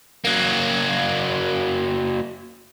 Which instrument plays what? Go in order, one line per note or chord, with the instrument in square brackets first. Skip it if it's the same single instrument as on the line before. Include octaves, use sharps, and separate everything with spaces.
[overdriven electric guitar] F#3 A#3